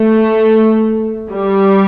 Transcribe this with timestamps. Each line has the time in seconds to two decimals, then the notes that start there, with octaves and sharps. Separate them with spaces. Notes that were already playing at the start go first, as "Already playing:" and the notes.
Already playing: A3
1.31 G3